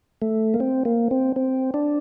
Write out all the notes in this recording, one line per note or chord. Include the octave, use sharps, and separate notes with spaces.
A3
A#3
C4
A#3
C4
C4
D4